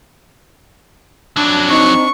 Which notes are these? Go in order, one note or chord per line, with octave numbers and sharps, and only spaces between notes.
F2 F#3 D4
C4 D#4 C#6